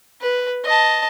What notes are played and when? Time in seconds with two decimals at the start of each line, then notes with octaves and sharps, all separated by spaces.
0.21 B4
0.65 D#5 A5